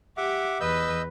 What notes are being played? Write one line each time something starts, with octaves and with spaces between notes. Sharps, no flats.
G4 E5 F#5 D6
E2 B4 D#5 E6 G6